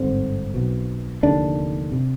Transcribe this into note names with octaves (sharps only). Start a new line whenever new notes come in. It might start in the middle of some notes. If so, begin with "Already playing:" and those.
Already playing: G#1 G2 D3 C4
B1 B2
F1 D#2 D3 D4
C3